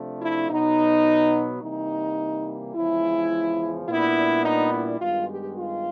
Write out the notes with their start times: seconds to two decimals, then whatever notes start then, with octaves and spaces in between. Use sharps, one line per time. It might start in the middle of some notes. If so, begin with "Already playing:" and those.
Already playing: C3 F3 A3 D4
0.22 E4
0.50 B2 F#3 B3 D#4
1.62 C3 E3 G3 A#3 D#4
2.75 E2 C#3 F3 G#3 E4
3.89 A#2 G3 B3 D4 E4
4.45 D#4
4.73 E4
5.00 G2 D#3 G#3 B3 F4
5.29 G4
5.57 F4